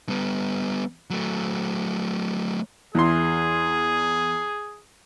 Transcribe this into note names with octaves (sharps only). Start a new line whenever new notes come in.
G3 B3
F#3 A3
E2 E3 G#4 C6